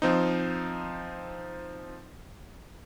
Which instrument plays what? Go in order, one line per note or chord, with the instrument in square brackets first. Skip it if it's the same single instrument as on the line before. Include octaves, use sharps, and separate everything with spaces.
[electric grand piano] F3 C4 D#4